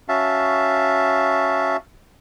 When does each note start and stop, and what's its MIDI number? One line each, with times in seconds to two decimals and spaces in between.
0.08 1.77 61
0.08 1.77 66
0.08 1.77 76
0.08 1.77 77
0.08 1.77 81